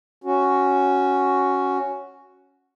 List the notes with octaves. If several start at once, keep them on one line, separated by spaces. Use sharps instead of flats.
C#4 F#4